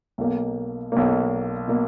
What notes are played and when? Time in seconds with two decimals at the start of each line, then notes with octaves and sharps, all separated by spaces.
0.18 B1 B2 A#3
0.92 B1 B2 A#3
1.68 B2 A#3